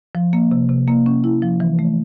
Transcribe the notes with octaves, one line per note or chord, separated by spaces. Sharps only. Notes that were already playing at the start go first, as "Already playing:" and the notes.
F3
A#3
C3
C3
A#3
C#4
E4
F3
E3
A3